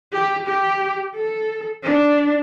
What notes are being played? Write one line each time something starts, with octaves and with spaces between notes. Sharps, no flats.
G4
G4
A4
D4